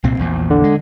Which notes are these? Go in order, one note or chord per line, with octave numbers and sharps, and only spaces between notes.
C2 A#2 C4
A#1 E2 A#2
D3
G#3